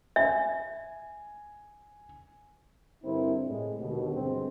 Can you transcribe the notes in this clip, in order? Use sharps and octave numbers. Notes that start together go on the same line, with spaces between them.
E5 G#5
G2 D3 C4 E4 A#4 C5
A2 C3 G#3
D#2 B2 D3
G2 D3 G#3 C4